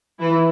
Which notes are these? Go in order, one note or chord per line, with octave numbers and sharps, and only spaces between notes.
E3 E4